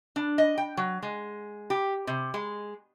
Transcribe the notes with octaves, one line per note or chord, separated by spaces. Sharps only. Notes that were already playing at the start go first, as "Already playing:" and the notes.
D4
D#5
G5
F#3
G#3
G4
C3
G#3